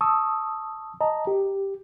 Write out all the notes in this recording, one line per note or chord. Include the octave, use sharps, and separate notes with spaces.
A5 C#6 D#6 E6
D#5 A5 A#5
G4